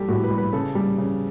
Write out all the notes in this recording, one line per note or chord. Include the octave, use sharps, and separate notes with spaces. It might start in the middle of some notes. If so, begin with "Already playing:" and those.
Already playing: G3 G4 A4
A2 F#4
B4
G3
B4
C#3 A4
G3
C#3